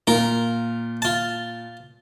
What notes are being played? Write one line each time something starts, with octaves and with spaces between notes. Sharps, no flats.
A#2 F4 A#4
F4 A5